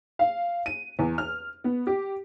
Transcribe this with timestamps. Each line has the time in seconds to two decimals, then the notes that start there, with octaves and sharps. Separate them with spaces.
0.19 F5
0.66 D#7
0.99 E2
1.18 F6
1.64 B3
1.87 G4